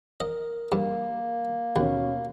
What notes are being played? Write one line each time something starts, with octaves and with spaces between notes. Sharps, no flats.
A#4 D#5
G2 A#3
D#2 B2 C#4